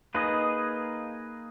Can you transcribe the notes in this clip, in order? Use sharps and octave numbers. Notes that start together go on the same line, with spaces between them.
A#3 D#4 G#4 B4 D#5